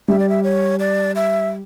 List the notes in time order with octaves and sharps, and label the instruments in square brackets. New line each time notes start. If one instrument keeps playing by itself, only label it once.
[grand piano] G3 [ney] E5
[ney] D5
E5
C#5
D5
E5